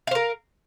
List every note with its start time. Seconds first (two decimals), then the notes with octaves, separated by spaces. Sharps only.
0.07 F5
0.11 C5
0.15 A#4